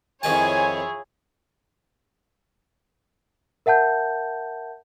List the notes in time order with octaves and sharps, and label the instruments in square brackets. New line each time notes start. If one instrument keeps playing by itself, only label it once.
[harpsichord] F2 D#3 A5 [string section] E4 F4 C#5 [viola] G#4 [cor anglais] G#5
[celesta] A#4 E5 F#5 A5 G6